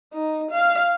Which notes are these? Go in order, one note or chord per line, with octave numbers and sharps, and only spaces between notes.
D#4
F5